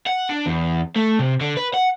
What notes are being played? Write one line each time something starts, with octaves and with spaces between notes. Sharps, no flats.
F#5
D4
E2
A3
C3
D3
B4
F#5